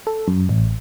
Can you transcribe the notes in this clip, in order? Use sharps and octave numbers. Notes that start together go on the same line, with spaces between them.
A4
F#2
A1